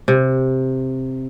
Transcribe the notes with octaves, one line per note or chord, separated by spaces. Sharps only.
C3